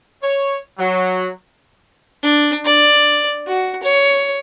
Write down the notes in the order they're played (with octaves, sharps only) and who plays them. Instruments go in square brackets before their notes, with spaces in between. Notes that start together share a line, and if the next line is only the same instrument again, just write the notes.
[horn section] C#5
F#3
[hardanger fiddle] D4
D5
F#4
C#5